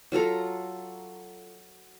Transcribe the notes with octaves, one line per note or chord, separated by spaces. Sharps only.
F#3 F4 A4 A#5